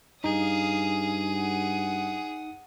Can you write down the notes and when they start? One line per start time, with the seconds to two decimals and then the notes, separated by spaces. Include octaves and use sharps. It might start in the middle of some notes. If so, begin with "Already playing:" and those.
0.24 G2 D#4 G#4 F5 D#6
1.33 F#5 D#6